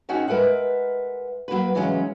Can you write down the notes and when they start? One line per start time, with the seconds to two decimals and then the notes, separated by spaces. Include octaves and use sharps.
0.09 C4 C#4 D#4 F#4 G#4 F#5
0.28 G#3 A#4 B4 E5 F#5
1.48 F#3 A#3 F#4 B4
1.75 C#3 E3 F#3 G#3 C#4